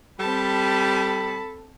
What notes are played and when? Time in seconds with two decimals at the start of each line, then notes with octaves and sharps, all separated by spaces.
0.19 G3 C4 A4 A5 B5